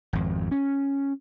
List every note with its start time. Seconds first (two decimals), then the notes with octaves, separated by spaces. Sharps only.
0.13 G#1 F2
0.51 C#4